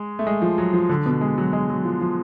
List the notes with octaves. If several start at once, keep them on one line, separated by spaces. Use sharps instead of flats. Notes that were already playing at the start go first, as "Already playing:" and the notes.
Already playing: G#3
A3
G#3
F3
F#3
F3
D3
B2
G#3
F#3
G#3
F#3
F3
F3